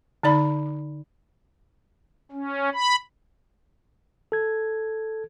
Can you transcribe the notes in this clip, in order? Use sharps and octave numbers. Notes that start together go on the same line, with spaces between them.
D3 D#4 D5 B5
C#4
B5
A4 G#6